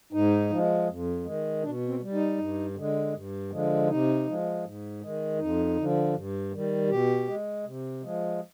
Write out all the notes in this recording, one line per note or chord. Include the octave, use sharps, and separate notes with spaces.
G#2 D#4
F3 G#3
F2
D#3 G#3
B2 D4
C4
G3
D#4
G2
D3 G#3
G2
D3 F3 G#3
C3 D#4
F3 G#3
G#2
D#3 G#3
F2 D#4
D3 F3
G2
D#3 G3
B2 G4
G#3
C3
F3 G#3